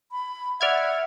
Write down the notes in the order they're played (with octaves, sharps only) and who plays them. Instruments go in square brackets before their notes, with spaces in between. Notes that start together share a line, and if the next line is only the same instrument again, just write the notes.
[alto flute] B5
[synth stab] D5 F6 G#6 [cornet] E5 [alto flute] F#5